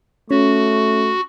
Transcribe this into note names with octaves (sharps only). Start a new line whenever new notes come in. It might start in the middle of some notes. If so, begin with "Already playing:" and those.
A3 C#4 F#4